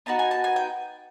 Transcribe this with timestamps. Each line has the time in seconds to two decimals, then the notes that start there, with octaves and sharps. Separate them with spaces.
0.06 B3 D#4 F#4 A5
0.19 G#5
0.31 A5
0.44 G#5
0.56 G5